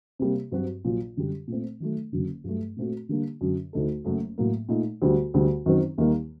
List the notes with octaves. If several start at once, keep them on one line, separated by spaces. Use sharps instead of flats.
C3 G3 A#3
G2 F#3 C4 F#4
A#1 A#2 F#3
F#2 D3 G3
A#2 A3 C4
D#3 F#3 A3
F#1 F#2 D3 F#3
G2 F#3 A3
A#2 A3 C4 F#4
D3 G3 A#3 D4
F#2 D3 F#3
D2 D3 A3 D#4 A4
F#1 F#2 F#3 A3
A2 F#3 A#3
A#2 A3 D#4
D2 D3 G3
D2 D3 G3
F#2 D#3 F#3 C4
D#2 D#3 G3 A#3